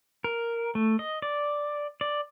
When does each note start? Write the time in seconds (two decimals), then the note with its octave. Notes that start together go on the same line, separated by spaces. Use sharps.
0.24 A#4
0.75 A3
0.99 D#5
1.22 D5
2.01 D5